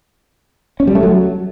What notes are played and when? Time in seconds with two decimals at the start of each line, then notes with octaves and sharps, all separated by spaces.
0.80 C#4
0.87 G3
0.95 A3
1.03 F#3